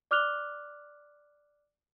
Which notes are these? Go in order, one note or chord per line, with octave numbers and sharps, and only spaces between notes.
D5 D6 F6 F#6 F7 G7